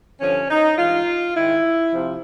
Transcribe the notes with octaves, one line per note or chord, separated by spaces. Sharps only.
G2 D3 F3 C#4
D#4
G2 E3 G#3 F4
G#2 D#3 G#3 E4
C3 F3